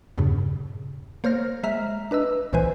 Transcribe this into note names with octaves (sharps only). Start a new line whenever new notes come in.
E2 G2 A#2 C#3
A#3 C5 C#5 F6 A#6
G#3 E5 A#5 F6 B6
D4 B4 D#5 E6
C2 A#2 E3 B4 C5 G#5